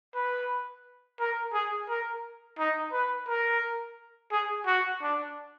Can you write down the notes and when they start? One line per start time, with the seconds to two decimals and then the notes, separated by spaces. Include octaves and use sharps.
0.14 B4
1.20 A#4
1.53 G#4
1.89 A#4
2.58 D#4
2.93 B4
3.28 A#4
4.31 G#4
4.66 F#4
5.02 D4